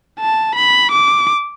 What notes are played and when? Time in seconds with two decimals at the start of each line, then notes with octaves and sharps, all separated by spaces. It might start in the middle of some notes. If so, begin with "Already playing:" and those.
0.20 A5
0.56 B5
0.92 D6